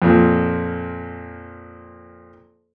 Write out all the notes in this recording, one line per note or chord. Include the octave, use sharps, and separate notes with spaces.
F2 A#2